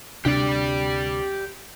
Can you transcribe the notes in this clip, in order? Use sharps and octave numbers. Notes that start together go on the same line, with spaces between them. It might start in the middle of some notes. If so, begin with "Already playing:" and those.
D2 C3 D4 G4 D5